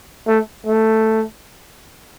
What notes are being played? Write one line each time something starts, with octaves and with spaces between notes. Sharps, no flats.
A3
A3